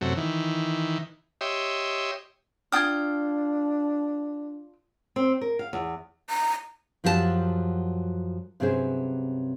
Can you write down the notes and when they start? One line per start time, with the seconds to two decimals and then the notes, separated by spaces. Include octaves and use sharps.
0.01 F#2 C3 F#3 A3
0.17 D#3 E3
1.41 G4 C#5 D#5 E5 C6
2.72 D4 F4 G5 D#6 F6 G#6
5.16 C4
5.41 A#4
5.59 F5
5.73 E2
6.30 A#5
7.04 F#2 F3 F#3 G4 A4 A5
8.60 G2 C3 F#3 C#4 G#4 C5